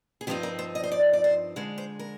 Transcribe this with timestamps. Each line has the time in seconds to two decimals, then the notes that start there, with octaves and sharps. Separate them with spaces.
0.21 G#4
0.27 G2 F3 C4 D#4 G4
0.43 A#4
0.59 C5
0.75 D#5
0.83 C5
0.92 D5
1.13 D5
1.24 C5
1.56 F2 D3 G#3 C5
1.78 C5
1.99 A#4